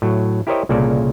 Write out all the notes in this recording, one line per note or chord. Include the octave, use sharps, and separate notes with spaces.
A2 F#3
E4 G4 A#4 C5 C#5 D#5
C2 A#2 C#3 A#3 A4 D5